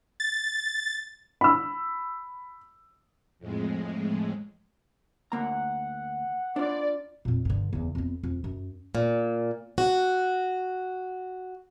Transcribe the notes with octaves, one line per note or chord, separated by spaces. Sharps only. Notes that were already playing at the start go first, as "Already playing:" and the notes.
A6
B5 E6
F2 A2 G#3
D2 A#3 F#5 A#5
D4 F4 D5
F2 A#2
G2 D3
E2 C#3
F2 B3
F2
F#2
A#2
F#4